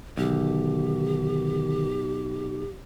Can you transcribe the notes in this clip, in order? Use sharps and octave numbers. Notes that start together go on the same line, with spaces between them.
B1 D3 D#3 G4